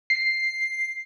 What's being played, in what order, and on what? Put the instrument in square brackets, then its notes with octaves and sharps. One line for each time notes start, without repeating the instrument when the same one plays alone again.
[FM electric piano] C7